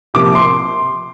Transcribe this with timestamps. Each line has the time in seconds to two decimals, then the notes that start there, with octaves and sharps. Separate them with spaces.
0.14 C3 F3 A#3 D6
0.35 C6